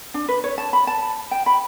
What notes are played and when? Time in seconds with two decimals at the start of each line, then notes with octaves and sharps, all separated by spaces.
0.14 D4
0.28 B4
0.44 C#5
0.58 A5
0.73 B5
0.87 A5
1.31 G5
1.46 B5